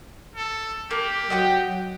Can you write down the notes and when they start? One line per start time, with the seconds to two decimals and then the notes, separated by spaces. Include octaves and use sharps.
0.36 A4
0.91 A#3 G4
1.30 F#3 D#5 F#5 G5